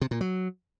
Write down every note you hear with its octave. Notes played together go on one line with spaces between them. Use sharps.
C3
A#2
F#3